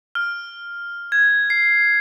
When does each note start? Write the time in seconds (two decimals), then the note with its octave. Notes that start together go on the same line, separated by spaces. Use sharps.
0.15 F6
1.12 G#6
1.50 C7